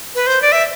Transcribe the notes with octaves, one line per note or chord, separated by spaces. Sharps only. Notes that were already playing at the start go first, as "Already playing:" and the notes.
B4
C5
D5
E5